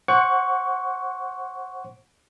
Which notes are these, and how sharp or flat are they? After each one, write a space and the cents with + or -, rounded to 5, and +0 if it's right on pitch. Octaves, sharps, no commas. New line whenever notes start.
C5 +30 F#5 +0 C#6 +20